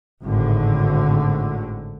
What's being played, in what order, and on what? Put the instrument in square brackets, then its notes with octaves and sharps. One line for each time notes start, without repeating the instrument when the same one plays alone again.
[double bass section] G#1 A2 D3